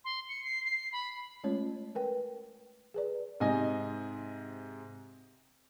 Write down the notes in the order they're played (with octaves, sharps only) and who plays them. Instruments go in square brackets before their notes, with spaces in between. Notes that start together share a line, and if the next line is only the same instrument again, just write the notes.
[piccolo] C6
C#7
C7
C7
B5
[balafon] G#3 A3 C#4 F4 C#5
A#4 B4 G5
G#4 B4 D5
[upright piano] G#2 C3 D#5 G#5